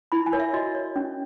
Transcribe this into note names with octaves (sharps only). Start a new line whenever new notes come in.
E4 B5
G#5
A#4 C#5
E5
F#4 D#5
C#5
C#4